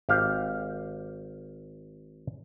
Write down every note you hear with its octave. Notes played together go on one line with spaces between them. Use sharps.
G#1 G4 F5